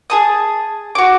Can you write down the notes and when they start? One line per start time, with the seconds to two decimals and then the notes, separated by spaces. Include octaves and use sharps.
0.10 G#4 A5 D#6
0.95 F#4 D6